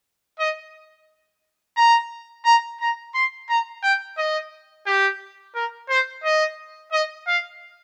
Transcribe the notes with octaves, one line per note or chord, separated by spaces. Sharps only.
D#5
A#5
A#5
A#5
C6
A#5
G5
D#5
G4
A#4
C5
D#5
D#5
F5